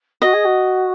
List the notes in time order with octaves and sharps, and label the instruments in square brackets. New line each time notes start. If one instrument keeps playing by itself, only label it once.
[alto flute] F#4 [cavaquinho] D#5
[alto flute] G#4
F#4